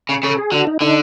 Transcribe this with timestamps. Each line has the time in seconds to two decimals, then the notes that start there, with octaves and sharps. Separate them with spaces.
0.09 C#3
0.23 C#3 A4
0.38 G#4
0.52 D3 F#4
0.67 D#4
0.81 D3 D#4